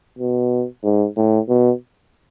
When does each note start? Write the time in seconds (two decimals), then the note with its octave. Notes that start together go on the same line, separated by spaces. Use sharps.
0.19 B2
0.83 G#2
1.17 A2
1.49 B2